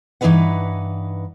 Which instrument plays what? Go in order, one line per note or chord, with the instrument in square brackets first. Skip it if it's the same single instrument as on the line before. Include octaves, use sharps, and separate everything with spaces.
[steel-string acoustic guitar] G2 E3 A#3 D#4 B4 F#5